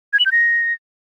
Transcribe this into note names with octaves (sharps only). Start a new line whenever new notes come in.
G#6
F#7
G6
A#6